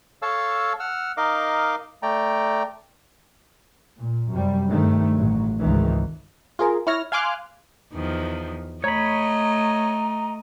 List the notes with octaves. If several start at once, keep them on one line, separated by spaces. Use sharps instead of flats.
A4 C#5 F5 A5 E6
F#5 E6 F6
D#4 A#4 D#5 F5 D6
A3 D5 G5 A#5
A#2
F#2 C3 G3
G2 C3 D#3 A3
A1 F#3
G#1 C#2 D#3 E3
F4 G#4 A#4
E4 C#5 F6 A#6
F5 G#5 C6 D6 F6 F#6
E2 D#3 F3
A3 C#5 D#5 A#5 B5